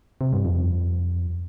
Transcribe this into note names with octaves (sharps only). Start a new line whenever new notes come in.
C3
G2
F2